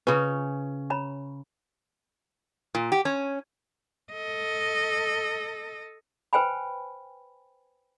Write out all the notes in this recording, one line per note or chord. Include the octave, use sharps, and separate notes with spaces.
C#3 C#4 F4 B4
C#5 A#5 B5
A#2
G4
C#4
A4 D#5
B4 C5 G5 G#5 B5